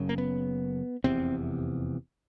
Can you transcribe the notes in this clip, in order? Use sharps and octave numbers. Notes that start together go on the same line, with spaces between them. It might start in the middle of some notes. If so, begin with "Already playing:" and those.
Already playing: F#1 F#2 C#3
A#3
B3
F1 E2 C3 C4